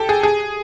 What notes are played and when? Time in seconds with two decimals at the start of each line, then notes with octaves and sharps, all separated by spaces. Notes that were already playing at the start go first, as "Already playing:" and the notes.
Already playing: G4 A4
0.09 G#4
0.23 G#4